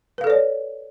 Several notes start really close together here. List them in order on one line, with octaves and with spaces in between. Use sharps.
B4 F5 A4 D5 C#5